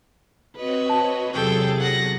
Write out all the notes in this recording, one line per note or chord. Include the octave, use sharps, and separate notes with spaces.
C4 F#4 B4 C#5 D#5
A5
E2 C3 F#3 G#4 A4 G5 A6
F#5 A#6